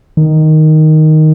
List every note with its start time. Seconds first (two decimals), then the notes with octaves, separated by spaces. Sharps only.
0.17 D#3